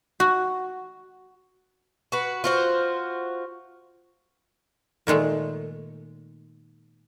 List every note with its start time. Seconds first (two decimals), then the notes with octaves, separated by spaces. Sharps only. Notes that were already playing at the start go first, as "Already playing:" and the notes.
0.20 F#4
2.12 F#4 B4
2.44 F4 F#4 C5
5.07 A#2 D#3 G#3 A3